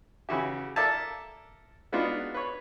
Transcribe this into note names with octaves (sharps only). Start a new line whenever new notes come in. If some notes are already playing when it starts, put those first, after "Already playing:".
C#3 E3 F#4 G4
A4 A#4 D5 E5 A5
G#3 B3 D4 D#4 F4 F#4
B4 C#5